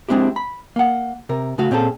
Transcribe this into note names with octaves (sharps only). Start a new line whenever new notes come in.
G#3 C4 D4 E4 G4
B5
A#3 F#5
C3 A#4
C#3 A3 F#4 F5
A#2 C4 C#4 G#4 A4